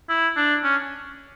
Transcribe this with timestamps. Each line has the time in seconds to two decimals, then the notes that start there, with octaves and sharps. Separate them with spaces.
0.09 E4
0.36 D4
0.64 C#4